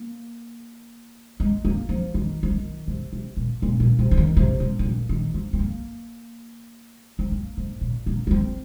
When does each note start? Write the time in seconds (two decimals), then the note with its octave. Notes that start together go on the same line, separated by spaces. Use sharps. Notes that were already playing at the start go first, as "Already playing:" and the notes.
Already playing: A#3
1.40 G#3
1.65 A#3
1.89 F3
2.14 D#3
2.43 F3
2.51 D#3
2.87 C3
3.13 C3
3.37 A#2
3.62 A#2
3.80 A#2
3.99 C3
4.11 F3
4.17 D#3
4.37 C3
4.60 G#2
4.79 G#2
4.85 A#2
5.09 D#3
5.34 C4
5.53 C4
5.59 A#3
7.19 C4
7.32 A#3
7.57 G#2
7.81 A#2
8.06 A#3
8.27 A#3
8.31 C4